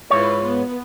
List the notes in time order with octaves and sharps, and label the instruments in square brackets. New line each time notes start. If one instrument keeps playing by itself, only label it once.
[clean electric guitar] G#2 C#5 [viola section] E4 F4 B4
[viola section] B3